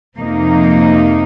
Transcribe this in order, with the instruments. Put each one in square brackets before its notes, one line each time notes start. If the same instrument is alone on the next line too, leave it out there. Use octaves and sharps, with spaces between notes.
[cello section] F2 C3 F3 A#3 D#4